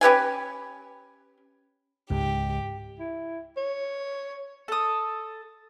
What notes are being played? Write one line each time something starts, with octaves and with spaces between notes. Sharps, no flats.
C#4 G4 B4 G#5
C#2 G#2 G4
E4
C#5
A4 D#6